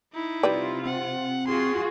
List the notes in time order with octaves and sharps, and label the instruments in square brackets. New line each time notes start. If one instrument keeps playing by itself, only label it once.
[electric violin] D#4 E4
[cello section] C3 F4 [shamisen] G3 B4 D5
[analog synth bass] C4 [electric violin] F#5
[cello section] F4 F#4 G#4 [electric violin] C6